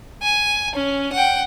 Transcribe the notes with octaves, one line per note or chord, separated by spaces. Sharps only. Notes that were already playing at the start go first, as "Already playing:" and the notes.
G#5
C#4
F#5 G5